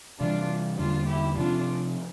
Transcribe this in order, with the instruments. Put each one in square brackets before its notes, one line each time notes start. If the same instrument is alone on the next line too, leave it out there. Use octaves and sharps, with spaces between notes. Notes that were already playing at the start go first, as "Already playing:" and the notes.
[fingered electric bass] C3 E3 G3 [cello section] D4 F4
[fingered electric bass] E2 D3 G3 A#3 [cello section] D4 F4
[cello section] E4 G4
[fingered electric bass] C3 F3 C4 [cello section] D4 F4